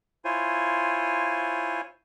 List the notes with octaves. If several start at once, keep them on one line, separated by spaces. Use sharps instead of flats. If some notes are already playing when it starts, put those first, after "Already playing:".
E4 F4 C5 C#5 G#5